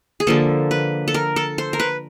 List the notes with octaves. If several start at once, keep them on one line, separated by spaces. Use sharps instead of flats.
G#4
D3 F3 A#3 A4
B4
A4
A#4
A4
C5
A#4
B4